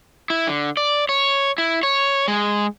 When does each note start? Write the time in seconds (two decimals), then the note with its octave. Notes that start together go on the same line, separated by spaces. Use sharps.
0.30 E4
0.47 D3
0.77 D5
1.09 C#5
1.58 E4
1.83 C#5
2.28 G#3